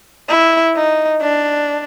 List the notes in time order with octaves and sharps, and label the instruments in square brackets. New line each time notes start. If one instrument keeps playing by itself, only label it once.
[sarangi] E4
D#4
D4